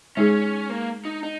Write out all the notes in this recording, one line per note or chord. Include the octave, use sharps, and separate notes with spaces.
G#3 C#4 D#4 G#4
A#3
D#4
D#4